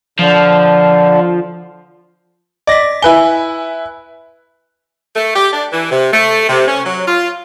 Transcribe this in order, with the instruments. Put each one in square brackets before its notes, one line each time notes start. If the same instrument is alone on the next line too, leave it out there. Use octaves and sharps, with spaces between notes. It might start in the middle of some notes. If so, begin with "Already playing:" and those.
[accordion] D3 [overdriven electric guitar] F3
[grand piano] D5 A#6 [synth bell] D#5 B6
[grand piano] E4 B4 G7 [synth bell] G#5
[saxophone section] A3
G4
D4
E3
C3
A3
C3
C#4
F#3
F4